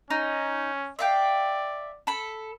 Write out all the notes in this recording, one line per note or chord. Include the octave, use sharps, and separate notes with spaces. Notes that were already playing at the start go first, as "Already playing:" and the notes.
C#4 D#4
D5 E5 F5 G5
A4 B5